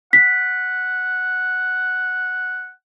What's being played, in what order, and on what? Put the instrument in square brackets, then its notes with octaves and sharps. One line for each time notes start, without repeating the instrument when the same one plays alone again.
[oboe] F#5 [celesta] B6